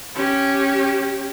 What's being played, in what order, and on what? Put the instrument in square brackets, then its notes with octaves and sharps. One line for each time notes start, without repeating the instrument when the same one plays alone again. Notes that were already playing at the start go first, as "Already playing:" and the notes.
[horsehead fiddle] C#4 G4